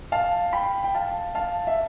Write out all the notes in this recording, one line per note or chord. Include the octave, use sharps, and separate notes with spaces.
F5 A5
G5 B5
G5
F5 A5
F5 A5
E5